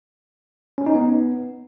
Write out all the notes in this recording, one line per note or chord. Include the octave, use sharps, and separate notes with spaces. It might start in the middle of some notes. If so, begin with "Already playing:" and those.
C#4
D#4
B3